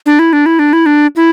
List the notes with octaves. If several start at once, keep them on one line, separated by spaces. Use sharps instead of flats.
D4
E4
D4
E4
D4
E4
D4
E4